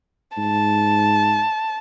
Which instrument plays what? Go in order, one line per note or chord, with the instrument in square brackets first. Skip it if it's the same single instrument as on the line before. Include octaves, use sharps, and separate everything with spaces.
[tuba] G#2 [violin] A5